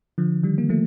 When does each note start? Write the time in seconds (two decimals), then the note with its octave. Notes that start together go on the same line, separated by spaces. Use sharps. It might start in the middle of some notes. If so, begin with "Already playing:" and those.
0.18 D3 F3
0.43 D#3 G3
0.58 A#3
0.69 F3 A3